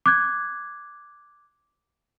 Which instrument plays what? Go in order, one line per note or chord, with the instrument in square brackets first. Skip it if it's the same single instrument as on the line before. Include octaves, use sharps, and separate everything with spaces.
[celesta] D6 F#6 G#6